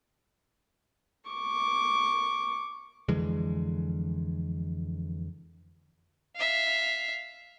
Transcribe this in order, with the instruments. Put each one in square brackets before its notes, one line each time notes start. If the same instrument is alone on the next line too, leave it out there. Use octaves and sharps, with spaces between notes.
[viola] C#6 D6
[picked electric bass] F2 D3 E3 G#3
[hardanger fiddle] E5 F5